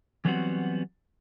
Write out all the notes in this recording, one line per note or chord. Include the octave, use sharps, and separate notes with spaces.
E3 F#3 G3 B3 C4 F#4